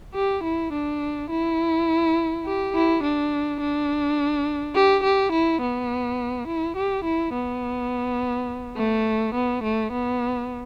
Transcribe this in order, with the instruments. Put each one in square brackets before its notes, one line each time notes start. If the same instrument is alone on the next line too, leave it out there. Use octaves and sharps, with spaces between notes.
[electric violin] G4
E4
D4
E4
G4
E4
D4
D4
G4
G4
E4
B3
E4
G4
E4
B3
A3
B3
A3
B3